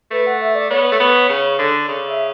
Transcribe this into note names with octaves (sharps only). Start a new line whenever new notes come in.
A3 B4
F#5
E5
D5
B3 C#5
A3
B3
C#3
D3
C#3 D5
E5